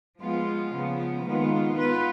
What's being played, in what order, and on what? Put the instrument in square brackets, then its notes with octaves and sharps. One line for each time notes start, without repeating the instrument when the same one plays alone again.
[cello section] F3 G#3 B3 F4
C#3 F3 B3
D#3 G#3 B3 F4
B3 F4 B4